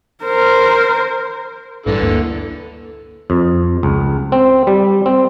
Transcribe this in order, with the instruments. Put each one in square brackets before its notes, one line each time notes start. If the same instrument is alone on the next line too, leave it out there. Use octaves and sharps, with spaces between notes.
[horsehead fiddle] A#4 C5
[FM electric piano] A1 G2 [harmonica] D3 E3 A4
[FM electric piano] D2 A#3
[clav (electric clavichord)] F2
C#2
C4
G3
C4